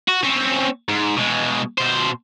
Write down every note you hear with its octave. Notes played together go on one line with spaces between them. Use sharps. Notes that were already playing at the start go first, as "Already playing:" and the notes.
F#4
C4 C#4
G#2
B2 G#3
B2 C5